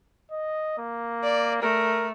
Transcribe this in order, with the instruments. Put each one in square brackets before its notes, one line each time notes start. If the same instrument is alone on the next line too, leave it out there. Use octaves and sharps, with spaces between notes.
[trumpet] D#5
A#3
[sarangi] D5
[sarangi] A3 [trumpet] A#4